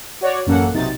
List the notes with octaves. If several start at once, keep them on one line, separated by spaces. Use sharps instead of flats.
F#4 C#5 D5
A1 F#2 A#3 C#4 A4 F#5
B1 C3 F#3 D#4 A6